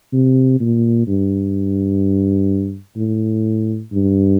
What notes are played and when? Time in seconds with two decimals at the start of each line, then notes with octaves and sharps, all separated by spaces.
0.13 C3
0.60 A#2
1.07 G2
2.97 A2
3.92 G2